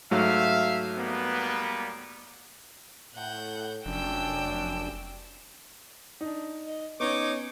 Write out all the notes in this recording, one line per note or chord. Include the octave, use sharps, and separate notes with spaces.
G#2 F#3 A3 E5 F5
G3 A#3 B3
A2 F#5 G6
F1 F#2 C#4 D4 G5 E6
D4 D#4
D#5
B3 C#4 D#4 C#5 D6